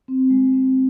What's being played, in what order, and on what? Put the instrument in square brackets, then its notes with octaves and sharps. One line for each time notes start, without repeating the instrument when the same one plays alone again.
[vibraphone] C4
G#3
C4